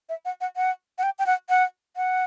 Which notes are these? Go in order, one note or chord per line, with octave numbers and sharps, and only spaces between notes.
E5
F#5
F#5
F#5
F#5
G5
G5
F#5
F#5
F#5